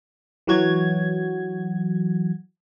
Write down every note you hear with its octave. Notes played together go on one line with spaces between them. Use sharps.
E3 F#3 F#4 G#6